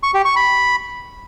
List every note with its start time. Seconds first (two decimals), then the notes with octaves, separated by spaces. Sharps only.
0.03 C#6
0.14 G4
0.25 C#6
0.36 B5